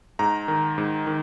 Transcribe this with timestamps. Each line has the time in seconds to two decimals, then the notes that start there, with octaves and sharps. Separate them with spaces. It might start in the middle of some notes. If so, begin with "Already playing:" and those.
0.19 G#2 A#5
0.48 D#3
0.78 G#2
1.07 D#3